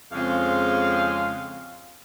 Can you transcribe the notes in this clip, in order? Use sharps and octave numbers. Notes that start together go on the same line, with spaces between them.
F2 C#3 G#3 C4 F5